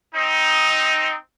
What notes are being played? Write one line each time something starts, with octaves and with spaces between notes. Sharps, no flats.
C4 D#4